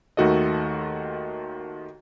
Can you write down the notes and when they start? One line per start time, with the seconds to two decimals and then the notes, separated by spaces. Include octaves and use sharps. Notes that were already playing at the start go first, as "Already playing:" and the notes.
0.17 D#2 D#3 A3 F#4 A4 D#5